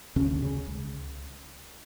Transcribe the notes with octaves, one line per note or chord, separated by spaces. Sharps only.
D2 C#3 C#4
C#3
C#2